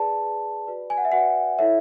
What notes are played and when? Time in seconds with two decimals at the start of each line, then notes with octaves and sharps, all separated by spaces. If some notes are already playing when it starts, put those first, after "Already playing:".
Already playing: G#4 B4 D5 A5
0.21 G#4 B4 D5
0.67 F#4 B4 D5
0.90 G#5
0.97 F#5
1.05 E5
1.12 F#4 B4 D5 F#5
1.59 E4 A4 C#5 E5